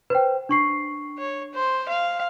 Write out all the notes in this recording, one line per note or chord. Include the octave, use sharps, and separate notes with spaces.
B4 C5 G5
D4 C#6 C7
C#5
C5
F5